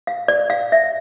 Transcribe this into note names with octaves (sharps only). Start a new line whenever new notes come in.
F5
D5
F5
E5